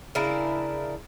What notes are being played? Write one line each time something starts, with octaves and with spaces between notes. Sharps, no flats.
C#3 D4 E4 A#4